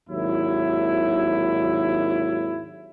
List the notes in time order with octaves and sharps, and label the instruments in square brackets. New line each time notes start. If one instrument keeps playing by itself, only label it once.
[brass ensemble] G#1 D#2 F#3 E4